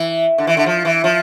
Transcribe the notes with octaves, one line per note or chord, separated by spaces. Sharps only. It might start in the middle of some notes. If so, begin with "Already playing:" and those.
Already playing: E3
D3
E3
D3
F3
E3
F3